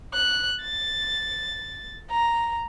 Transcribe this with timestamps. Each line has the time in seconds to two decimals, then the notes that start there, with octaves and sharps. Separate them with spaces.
0.14 F#6
0.62 A6
2.10 A#5